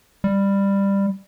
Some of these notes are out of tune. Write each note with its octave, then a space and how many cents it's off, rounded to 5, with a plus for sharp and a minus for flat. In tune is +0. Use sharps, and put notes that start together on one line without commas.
G3 +15